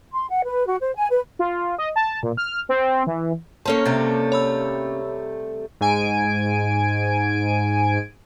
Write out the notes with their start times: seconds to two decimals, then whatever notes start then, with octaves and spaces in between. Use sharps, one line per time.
0.12 C6
0.29 F#5
0.45 B4
0.66 F#4
0.80 C5
0.95 G#5
1.09 B4
1.39 F4
1.78 D#5
1.96 A5
2.23 A#2
2.37 F6
2.69 C4
3.07 E3
3.66 A#3 C#4 A4 C5 C#5 A5
3.86 C3 G3 A3
4.32 C#5 B5 E6
5.81 G#2 G#5 D7